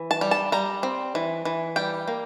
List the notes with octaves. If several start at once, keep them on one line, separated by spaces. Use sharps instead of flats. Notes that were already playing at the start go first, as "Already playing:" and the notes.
Already playing: E3
A5
G3
A5
G3 A#5
C4
E3
E3
G3 G5
A#3